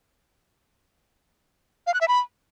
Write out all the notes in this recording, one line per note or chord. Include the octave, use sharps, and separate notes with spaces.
F5
F#6
E5
B5